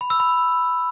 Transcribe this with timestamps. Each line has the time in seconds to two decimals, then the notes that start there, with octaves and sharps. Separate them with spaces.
0.01 B5
0.10 E6
0.20 B5